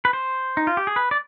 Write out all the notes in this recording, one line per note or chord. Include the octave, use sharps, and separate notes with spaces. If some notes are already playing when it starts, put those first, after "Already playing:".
B4
C5
D#4
F4
G4
G#4
B4
D5